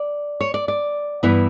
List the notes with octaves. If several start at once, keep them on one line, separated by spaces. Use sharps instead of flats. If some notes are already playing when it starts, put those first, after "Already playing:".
Already playing: D5
C#5
D5
D5
G2 E3 B3 E4